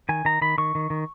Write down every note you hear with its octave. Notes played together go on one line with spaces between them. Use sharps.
D#3 G#5
D#3 A#5
D#3 B5
D#3 C#6
D#3
D#3